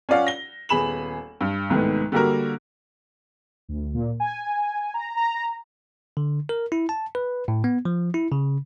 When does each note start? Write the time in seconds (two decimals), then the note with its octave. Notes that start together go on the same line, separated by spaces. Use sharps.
0.09 C#4 F4 D5 F5 F#5
0.27 A#6 G7
0.69 D#1 B3 G#4 B5 E7 F#7
1.41 G2
1.70 C2 G#2 D#3 A3 B3
2.12 D3 G3 A#3 F#4 A#4
3.69 D2
3.94 A#2
4.20 G#5
4.94 A#5
5.17 A#5
6.17 D3
6.49 A#4
6.72 E4
6.89 A5
7.15 B4
7.48 A2
7.64 B3
7.85 F3
8.14 E4
8.32 C#3